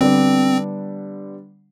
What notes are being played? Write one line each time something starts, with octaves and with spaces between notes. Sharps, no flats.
D3 G3 B3 C4 D4